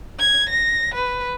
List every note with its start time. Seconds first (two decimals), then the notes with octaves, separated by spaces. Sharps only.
0.20 G#6
0.49 A#6
0.94 B4